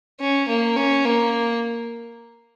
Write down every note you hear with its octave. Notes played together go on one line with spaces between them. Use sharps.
C#4
A#3
C#4
A#3